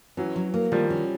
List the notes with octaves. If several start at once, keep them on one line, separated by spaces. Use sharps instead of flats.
E3 F#3 C#4
F#3
A#3
D#3 F3 G3
C#4